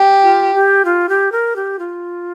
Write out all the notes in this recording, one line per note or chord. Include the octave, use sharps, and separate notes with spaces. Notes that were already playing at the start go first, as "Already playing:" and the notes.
Already playing: G4
F4
G4
F4
G4
A#4
G4
F4